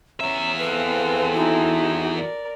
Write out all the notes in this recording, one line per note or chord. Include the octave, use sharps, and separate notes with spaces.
E2 C#4 E5 A#5
C4 G#4 A4 B4 F5
D#4 E4 F#4
A#4 D5